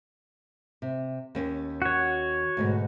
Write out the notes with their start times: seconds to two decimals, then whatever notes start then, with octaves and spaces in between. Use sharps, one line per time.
0.82 C3
1.35 D#2 C#4
1.82 F#4 C#5
2.57 D2 G#2 B2